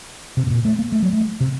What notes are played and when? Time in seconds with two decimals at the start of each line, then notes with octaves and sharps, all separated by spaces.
0.37 C3
0.47 A2
0.50 A#2
0.65 A3
0.79 A#3
0.92 A3
1.02 F#3
1.13 A3
1.40 C3